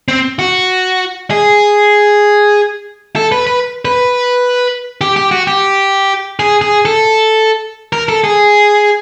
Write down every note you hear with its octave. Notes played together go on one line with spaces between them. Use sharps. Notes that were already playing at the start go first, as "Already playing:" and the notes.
C4
F#4
G#4
A4
B4
B4
B4
G4
G4
F#4
G4
G#4
G#4
A4
A#4
A4
G#4